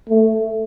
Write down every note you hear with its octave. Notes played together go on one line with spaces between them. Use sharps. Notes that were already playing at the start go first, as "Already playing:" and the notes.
A3